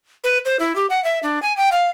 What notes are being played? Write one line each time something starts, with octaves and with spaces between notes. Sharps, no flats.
B4
C5
E4
G4
F#5
E5
D4
G#5
G5
F5